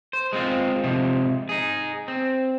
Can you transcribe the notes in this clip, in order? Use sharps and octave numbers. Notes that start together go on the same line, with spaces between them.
C5
G#3 C4 F4
C3 F3 G#3
D#4 G#4
C4